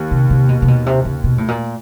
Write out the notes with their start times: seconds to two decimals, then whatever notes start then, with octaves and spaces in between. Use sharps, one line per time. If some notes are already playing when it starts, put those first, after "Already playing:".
Already playing: D#2
0.11 C3
0.30 C3
0.49 B2
0.62 C3
0.68 B2
0.86 C3
1.05 C#3
1.24 B2
1.38 A2
1.48 A#2